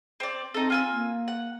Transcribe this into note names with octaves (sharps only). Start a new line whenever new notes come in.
C4 D5
C4 D#4 A4
F4 G#5 E6
A#3
F#5